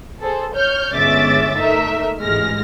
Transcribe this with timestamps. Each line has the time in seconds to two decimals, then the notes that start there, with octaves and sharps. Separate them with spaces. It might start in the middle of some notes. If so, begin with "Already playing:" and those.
0.21 G#4 A4 C5
0.52 C#5 F6 G6
0.93 G1 G#3 C#4 E5 D6 A6
1.57 A3 D#4 A#4 E5
2.23 A1 G#2 G#3 F6 A#6